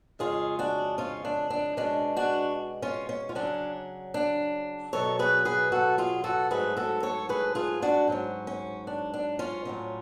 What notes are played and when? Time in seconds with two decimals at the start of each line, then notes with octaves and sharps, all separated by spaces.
0.19 F2 C#3 G#3 C#4 F4 G#4
0.59 D4 F#4
0.98 C#4 F4
1.25 D4
1.50 D4
1.77 B2 G#3 C#4 D4
2.16 D4 F#4
2.82 C#4 F4
3.09 C#4
3.29 F4
3.35 C#3 F#3 C#4 D4
4.14 D4
4.93 B2 F#3 B3 A4 C#5
5.19 G#4 B4
5.45 G#4 B4
5.72 F#4 A4
5.98 F4 G#4
6.24 F#4 A4
6.51 G#2 F#3 A3 G#4 B4
6.77 F#4 A4
7.03 A4 C#5
7.29 G#4 B4
7.55 F4 G#4
7.82 D4 F#4
8.08 G#2 F#3 C#4
8.47 C#4
8.87 D4
9.14 D4
9.39 C#4 F4
9.65 A2 F#3 C#4